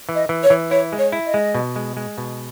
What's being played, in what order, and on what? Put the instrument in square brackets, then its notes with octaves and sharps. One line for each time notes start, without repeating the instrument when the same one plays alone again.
[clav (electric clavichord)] E3
[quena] D#5
[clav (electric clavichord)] E3
[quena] C#5
[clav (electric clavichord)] E3
[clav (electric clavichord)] E4 [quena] C#5
[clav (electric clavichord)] G#3
[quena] C#5
[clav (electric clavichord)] E4
[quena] D#5
[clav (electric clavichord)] G#3
B2
G#3
G#3
B2